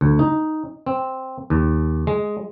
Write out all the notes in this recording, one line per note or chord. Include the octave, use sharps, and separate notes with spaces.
D2
D#4
C4
D#2
G#3